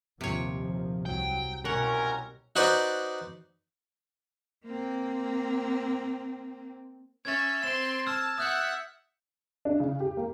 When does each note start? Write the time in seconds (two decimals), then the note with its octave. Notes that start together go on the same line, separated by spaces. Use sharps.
0.21 A#1 D#2 C3 F3 C#5
1.06 C2 F#3 G5
1.65 C2 B2 F#3 C#4 A#4 F#5
2.56 D#4 F#4 B4 C5 D5
4.65 A#3 C4
7.25 C#4 E5 G#6 A6
7.63 C4 C6 E7
8.07 A5 E6 F6 G#6
8.38 E5 F#5 D#6 F#6 G6
9.65 D4
9.80 C#3
10.00 G4
10.17 A#3